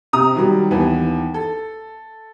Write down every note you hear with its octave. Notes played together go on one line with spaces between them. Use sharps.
C3 A#5 D#6
D#3 F#3 G3
D#2 E3 B3
A4